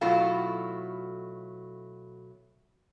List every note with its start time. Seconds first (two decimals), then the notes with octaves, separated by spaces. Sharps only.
0.01 B2 F#3 A3 E4 F4 A4